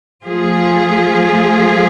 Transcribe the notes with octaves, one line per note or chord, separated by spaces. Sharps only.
F3 A3 F4 G#4